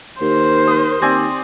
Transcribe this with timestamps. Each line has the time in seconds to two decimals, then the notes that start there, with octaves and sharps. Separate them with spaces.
0.21 D#2 A#4 C5
0.67 D#6
1.02 D#2 C4 D5 G#5 C6